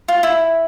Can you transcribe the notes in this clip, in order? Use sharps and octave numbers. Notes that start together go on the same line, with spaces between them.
F4
E4